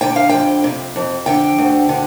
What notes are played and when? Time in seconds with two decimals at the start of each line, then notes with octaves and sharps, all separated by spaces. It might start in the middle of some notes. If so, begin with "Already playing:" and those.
0.01 D3 G5
0.16 F5
0.29 F2 G5
0.64 C3
0.96 F2
1.26 D3 G5
1.58 D2
1.89 D3